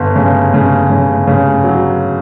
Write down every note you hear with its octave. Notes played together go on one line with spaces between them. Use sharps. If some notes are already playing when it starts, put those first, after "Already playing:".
Already playing: G1
C#3
C#3
C#3
C#3
F#3